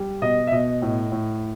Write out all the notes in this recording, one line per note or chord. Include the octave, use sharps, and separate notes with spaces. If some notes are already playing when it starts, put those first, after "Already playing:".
Already playing: G3
B2 D#5
E5
B2 D#5
A2
A2